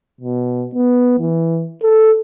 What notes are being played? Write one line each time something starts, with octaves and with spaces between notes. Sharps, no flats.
B2
B3
E3
A4